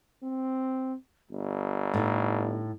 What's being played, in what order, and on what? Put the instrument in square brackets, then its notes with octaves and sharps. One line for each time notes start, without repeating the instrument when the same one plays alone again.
[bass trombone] C4
G1
[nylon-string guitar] A2 D#4